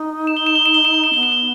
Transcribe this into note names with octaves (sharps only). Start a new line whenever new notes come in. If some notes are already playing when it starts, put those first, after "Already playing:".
Already playing: D#4
E7
G7
E7
G7
E7
G7
E7
G7
E7
B3 G7
E7
G7